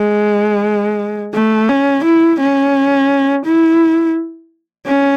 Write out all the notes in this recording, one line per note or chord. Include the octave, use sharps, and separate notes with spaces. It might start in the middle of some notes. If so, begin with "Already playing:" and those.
Already playing: G#3
A3
C#4
E4
C#4
E4
C#4